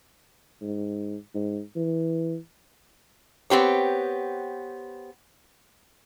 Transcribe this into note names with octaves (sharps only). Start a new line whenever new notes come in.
G#2
G#2
E3
B3 C4 G4 C#5